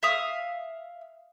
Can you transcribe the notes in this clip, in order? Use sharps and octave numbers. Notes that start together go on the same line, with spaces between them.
E5 F5 D#6